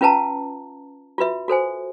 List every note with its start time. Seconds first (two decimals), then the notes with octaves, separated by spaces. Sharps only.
0.01 C#4 F4 B4 F5 A5 A#5
1.18 F4 F#4 B4 E5
1.48 F#4 A4 C5 G#5